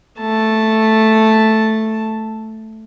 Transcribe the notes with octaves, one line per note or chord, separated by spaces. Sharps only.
A3 A5